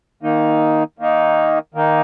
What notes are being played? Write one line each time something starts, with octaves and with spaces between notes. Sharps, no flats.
D#3 A#3 D#4
D#3 A#3 D#4
D#3 A#3 D#4